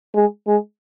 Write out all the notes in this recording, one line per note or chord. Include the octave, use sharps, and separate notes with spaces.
G#3
G#3